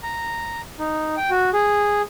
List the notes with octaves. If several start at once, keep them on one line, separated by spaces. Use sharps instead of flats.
A#5
D#4
G5
F#4
G#4